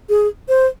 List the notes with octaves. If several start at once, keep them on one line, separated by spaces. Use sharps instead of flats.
G#4
C5